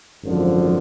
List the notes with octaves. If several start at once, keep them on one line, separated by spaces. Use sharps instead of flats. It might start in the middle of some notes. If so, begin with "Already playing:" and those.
G#1 F#2 D3 F3